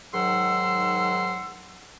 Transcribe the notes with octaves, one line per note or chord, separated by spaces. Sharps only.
G#2 D#3 F#3 F#5 C6 E6